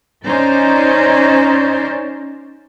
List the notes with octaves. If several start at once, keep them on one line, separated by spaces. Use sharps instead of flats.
C#4 D#4 C5 D5